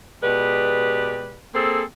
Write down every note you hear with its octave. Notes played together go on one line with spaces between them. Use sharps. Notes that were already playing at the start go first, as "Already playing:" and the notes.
B2 G#3 G4 B4 D5
A#3 C4 G#4 A4